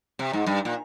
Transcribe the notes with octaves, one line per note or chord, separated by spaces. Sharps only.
C3
G#2
G2
A#2